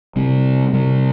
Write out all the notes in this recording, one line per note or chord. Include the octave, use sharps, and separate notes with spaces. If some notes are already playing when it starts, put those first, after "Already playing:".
C3 G3 C4
C3 G3 C4